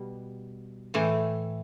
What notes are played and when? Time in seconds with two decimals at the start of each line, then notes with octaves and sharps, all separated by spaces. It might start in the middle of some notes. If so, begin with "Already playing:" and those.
Already playing: B2 G3
0.94 A2 E3 A3